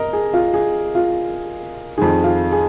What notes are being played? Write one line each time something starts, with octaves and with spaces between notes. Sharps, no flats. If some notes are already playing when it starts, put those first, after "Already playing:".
Already playing: A#4 D#5
G#4
F4
G#4
F4
F2 D#3 G#4
F4
G#4